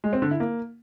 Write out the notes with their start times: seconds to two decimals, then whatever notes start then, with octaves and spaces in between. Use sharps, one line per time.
0.04 G#3
0.13 C4
0.22 D3
0.31 E4
0.40 A#3